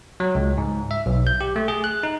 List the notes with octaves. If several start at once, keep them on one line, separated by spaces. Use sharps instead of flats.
F#3
C#2
G#2
E5
B1
G6
G4
A3
G#4
F#6
D#4